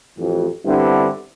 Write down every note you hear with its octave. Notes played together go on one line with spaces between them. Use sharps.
A1 F2
G2 D3 G3 B3 C4 E4